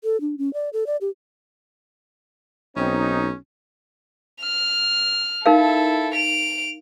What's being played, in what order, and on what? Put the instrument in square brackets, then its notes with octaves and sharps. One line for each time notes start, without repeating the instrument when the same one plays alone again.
[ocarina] A4
D4
C#4
D5
A4
D5
G4
[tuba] B1 [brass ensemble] C4 D#4 [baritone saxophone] C#4
[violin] F6
[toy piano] D#4 A#4 F5 [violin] E4 A4
[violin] D7 F7